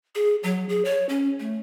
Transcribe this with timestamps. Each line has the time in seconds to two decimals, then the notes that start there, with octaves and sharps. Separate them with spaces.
0.15 G#4
0.43 F#3
0.69 G#4
0.85 C#5
1.09 C#4
1.40 A3